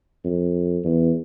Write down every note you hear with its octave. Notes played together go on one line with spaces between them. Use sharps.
F2
E2